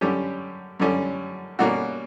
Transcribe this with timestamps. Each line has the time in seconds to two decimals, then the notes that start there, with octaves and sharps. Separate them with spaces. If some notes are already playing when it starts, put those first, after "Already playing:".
0.01 F#2 D3 G3 C#4 G4
0.80 F#2 D3 G3 C#4
1.59 B2 G3 A#3 C#4 F#4